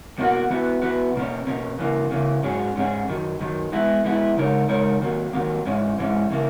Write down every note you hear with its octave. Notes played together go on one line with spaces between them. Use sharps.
E2 B2 A#3 D#4 F#4
E3 B3 F#4 B4
E3 B3 F#4 B4
B2 A#3 C#4
B2 A#3 C#4
C#3 E3 A#3
C#3 E3 A#3
G#2 F#3 C#4 G#4
G#2 F#3 C#4 G#4
F#2 D#3 F#3
F#2 D#3 F#3
E3 G#3 B3 E4
E3 G#3 B3 E4
C#3 G#3 D#4 A#4 C#5
C#3 G#3 D#4 A#4 C#5
D#3 F#3 A#3
D#3 F#3 A#3
G#2 E3 G#3 C#4
G#2 E3 G#3 C#4
C#3 E3 A#3